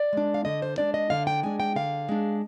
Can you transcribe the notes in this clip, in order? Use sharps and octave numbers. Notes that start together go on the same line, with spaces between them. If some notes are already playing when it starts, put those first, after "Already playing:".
Already playing: D5
G#3 D4
F5
D3 D#5
C5
G#3 D4 D5
D#5
D3 F5
G5
G#3 D4 G#5
G5
D3 F5
G#3 D4